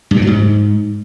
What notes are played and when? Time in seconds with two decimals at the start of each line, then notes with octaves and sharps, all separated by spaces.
0.11 G2
0.16 A#2
0.22 F#3
0.27 G#2